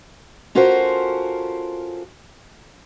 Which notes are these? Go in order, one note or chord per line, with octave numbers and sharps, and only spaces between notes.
C#4 F4 F#4 A4 A#4 C5